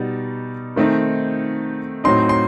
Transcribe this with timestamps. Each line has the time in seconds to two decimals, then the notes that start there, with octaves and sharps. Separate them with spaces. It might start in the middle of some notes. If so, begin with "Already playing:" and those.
Already playing: B2 G3 D#4
0.76 D#3 A3 C4 D#4
2.04 A2 F#3 C4 D#4 C6
2.29 C6